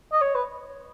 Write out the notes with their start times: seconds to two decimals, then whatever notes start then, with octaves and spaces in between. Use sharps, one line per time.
0.12 D#5
0.22 C#5
0.35 B4